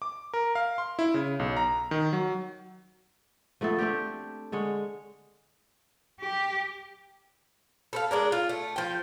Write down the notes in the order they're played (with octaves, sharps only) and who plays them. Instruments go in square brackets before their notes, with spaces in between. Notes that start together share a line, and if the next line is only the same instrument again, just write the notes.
[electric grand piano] D6
A#4
F5
C6
E4
C#3
B1
A#5
D#3
F#3
[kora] F3 A3 B3 A4
A3 C4 D4 G4
D3 G#3 C#5
[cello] G4
[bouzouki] A4 C5 F5
G#3 D4 A#4
F4
A3
F3 G5